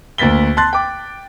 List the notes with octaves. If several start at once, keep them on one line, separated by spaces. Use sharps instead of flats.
D2 A#3 A6 B6 G7
A5 C6 F#6 A6
G5 D6